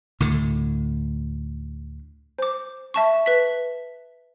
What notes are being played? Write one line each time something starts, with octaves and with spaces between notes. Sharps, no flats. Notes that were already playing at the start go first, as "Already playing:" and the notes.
D2 A2 D3
C5 D6
E5 A5 C#6
B4 B6